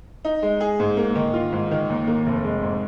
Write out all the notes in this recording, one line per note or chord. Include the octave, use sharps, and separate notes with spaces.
D#4
G#3
G#4
G#2
A#3
D#3
F4
G#2
D#3
D#2
A#3
F1
G#3
G#2